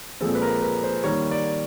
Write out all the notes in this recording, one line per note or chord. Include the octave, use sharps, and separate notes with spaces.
A#2 F3 G#3 C4 A4
B4
A#4
B4
C5
D#3 G3 A#3 C#5
D5